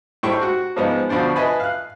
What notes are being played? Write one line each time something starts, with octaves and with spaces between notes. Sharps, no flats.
A2 G3 G#3 C5 G5 C#6
F#4 F#5
G#2 F3 G#3 B3 D#4
D2 B2 F3 D4 C5
B4 D#5 E5 G#5 A5 B5
F5 F#6